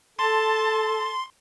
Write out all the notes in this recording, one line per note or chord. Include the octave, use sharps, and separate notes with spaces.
A4 A5 C6